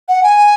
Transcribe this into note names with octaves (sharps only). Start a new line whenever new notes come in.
F#5
G#5